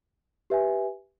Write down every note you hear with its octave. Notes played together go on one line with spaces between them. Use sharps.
G4 B4 E5 G#5